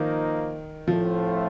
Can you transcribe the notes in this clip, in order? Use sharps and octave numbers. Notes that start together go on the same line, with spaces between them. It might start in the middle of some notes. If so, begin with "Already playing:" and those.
Already playing: D#3 F3 A#3 D#4
A2 F3 A3 C4 F4